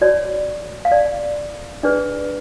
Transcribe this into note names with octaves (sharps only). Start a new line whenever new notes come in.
F#4 C#5 D5
F5
D5
D4 G#4 B4 D5